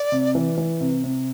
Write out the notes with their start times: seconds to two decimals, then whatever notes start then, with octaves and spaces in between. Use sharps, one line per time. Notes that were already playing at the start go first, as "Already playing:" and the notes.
Already playing: D5
0.12 C3
0.35 E3
0.58 E3
0.81 C3
1.04 C3